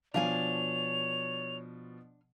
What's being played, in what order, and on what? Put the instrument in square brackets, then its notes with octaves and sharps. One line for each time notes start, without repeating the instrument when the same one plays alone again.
[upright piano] B2 F3 [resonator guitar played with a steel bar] D4 F5 G#5 [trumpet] C#5 [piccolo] F7